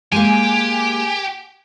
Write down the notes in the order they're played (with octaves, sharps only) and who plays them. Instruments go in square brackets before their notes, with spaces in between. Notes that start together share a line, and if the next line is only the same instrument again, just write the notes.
[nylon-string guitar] G#3 A#3 [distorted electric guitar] G4 [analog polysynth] G#5